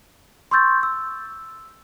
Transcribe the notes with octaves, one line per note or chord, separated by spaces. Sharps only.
C6 C#6 E6 G6 A6
E6